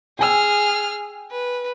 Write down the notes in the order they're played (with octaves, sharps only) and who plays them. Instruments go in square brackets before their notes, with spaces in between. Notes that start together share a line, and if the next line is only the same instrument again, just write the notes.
[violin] G#4 F6 [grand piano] G5 G#5 E6
[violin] B4